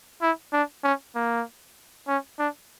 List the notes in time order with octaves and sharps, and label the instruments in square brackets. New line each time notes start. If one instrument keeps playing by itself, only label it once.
[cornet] E4
D4
C#4
A#3
C#4
D4